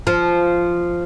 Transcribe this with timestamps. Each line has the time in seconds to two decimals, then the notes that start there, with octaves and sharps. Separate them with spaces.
0.07 F3